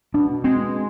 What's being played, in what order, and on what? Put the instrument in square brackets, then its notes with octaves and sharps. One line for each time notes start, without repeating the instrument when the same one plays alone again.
[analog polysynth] B2 [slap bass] D4
[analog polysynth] G#3 [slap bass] C4